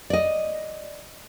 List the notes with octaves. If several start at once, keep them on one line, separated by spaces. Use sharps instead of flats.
D5 D#5